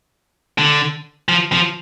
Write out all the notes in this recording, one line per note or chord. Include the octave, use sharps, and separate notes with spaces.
D3
F3
F3